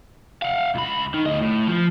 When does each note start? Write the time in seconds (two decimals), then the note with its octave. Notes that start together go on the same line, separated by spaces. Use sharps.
0.42 F5 F#5
0.75 C#2 B5
1.14 D#3
1.26 D2 D#5
1.41 A2
1.68 F3